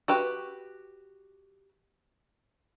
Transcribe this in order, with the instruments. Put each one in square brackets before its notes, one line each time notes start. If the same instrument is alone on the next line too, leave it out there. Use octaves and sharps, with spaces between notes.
[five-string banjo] F#4 G4 B4